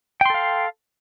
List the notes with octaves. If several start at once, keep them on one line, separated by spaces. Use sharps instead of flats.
A4 F5 G5 C6